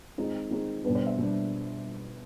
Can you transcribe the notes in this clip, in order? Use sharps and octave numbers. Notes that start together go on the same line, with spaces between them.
D#3 G#3 C4 D#4
D#3 G#3 C4 D#4
B2 G3 B3 D4 B4
C5
E5
B2 G3 B3 D4